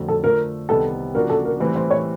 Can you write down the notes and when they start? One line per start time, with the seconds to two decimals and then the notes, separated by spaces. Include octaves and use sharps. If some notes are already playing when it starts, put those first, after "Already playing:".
Already playing: F2 D3 F#3 A3
0.08 A4
0.23 D3 F3 A3 A#4
0.69 C2 C3 D#3 G3 B3 A4
1.15 C#3 F3 A#3 D4 F#4 A#4
1.30 A4
1.45 A#4
1.60 A2 E3 G3 C4 B4
1.76 C5
1.91 C#5